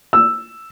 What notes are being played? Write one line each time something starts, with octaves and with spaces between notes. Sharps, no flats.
E6